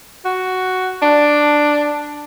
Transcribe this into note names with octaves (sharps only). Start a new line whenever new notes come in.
F#4
D4